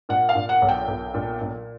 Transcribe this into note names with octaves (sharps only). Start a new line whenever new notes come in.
A#2 F#5
F5
A#2
F#5
B1
G5
B1
A#2
A#2